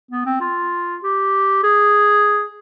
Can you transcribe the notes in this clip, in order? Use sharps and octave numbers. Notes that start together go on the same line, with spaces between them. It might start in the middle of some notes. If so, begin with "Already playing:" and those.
B3
C4
F4
G4
G#4